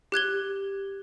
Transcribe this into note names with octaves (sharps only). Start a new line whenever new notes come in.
G4 F#6 G#6 G7